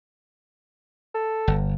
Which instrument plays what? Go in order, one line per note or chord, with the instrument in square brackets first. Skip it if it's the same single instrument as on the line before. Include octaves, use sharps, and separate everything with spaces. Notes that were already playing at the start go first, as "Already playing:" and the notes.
[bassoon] A4
[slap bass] G1